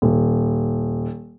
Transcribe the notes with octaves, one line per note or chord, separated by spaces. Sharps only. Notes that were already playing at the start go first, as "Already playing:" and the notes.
D#1